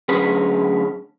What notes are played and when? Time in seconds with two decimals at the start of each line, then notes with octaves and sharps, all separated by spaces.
0.09 A2 D3 F#3 C#4 G#4 B4